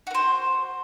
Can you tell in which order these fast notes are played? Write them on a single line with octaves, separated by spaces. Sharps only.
F#4 A#4 C5